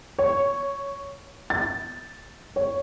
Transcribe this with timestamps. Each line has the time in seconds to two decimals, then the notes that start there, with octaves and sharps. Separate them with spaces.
0.19 C#5
1.50 A6
2.56 C#5